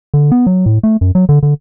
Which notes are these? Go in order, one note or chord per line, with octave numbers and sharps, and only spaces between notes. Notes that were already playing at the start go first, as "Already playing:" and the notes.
D3
B3
F#3
A2
A3
F#2
F#3
D3
D3